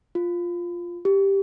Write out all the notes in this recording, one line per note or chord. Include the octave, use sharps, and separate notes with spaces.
F4
G4